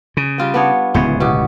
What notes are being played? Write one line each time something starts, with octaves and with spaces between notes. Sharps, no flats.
C#3
G3 F4 G5
B3 D4 C#5
D1 C#2 E3 B3 C5 C#5
B2 F#4 G4